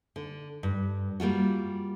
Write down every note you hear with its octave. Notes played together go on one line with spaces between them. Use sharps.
D3
G2
G3 A#3 F4 F#4